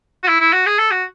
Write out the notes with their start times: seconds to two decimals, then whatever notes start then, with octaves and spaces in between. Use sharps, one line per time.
0.23 F#4
0.28 E4
0.40 E4
0.53 F#4
0.66 G#4
0.78 A4
0.91 F#4